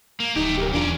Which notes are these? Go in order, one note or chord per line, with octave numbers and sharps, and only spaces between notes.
A#3
D1 A3 D#4 G4
B1 G4 A#4
E2 C#4 D4 F4 D5 A#5